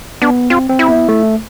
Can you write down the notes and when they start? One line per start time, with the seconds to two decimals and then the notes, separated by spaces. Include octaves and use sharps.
0.22 B3 D4
0.50 C4 F4
0.70 C4
0.79 E4
0.88 B3
1.09 A3